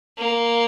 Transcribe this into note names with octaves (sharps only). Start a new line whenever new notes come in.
A#3